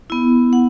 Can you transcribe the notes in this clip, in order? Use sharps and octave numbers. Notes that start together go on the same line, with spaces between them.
B3 E4
F#5